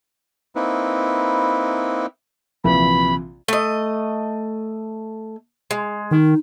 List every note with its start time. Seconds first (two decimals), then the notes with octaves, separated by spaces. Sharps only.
0.56 A#3 C4 D#4 E4 B4
2.64 A#1 C3 E3 B5
3.48 A3 D#5
5.71 G#3
6.11 D#3 D#4